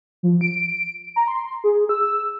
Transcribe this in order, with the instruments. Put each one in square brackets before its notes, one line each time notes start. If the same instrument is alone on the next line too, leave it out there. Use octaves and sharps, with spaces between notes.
[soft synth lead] F3
D7
A#5
C6
G#4
E6